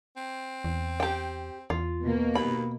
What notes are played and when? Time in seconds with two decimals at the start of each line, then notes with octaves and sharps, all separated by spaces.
0.16 C4
0.64 E2
1.00 G4 G5
1.70 E2 F4
2.03 B2 A#3
2.35 D#2 B5